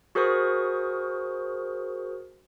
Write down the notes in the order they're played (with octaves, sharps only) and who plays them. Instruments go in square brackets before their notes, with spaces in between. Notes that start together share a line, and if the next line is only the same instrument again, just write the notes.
[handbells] F#4 G#4 A#4 C5 C#6 D#6